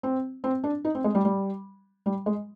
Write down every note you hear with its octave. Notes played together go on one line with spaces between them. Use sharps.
C4
C4
D4
D#4
C4
G#3
G3
G3
G3
G#3